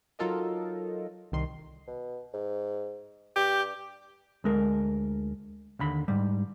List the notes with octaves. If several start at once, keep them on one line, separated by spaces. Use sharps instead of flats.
F#3 D#4 F4 A4 A#4 D#5
C2 D#3 C6
B2
G#2
G2 G4
D2 G#3 A#4
D#2 D3 B5
G#2 G3